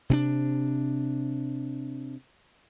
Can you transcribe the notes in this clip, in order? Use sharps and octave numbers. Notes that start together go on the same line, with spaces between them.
C3 C4 D4